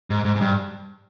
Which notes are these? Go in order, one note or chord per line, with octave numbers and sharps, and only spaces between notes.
G#2
G#2
G#2
G2